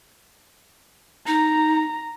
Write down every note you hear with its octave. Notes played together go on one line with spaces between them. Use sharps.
D#4 A#5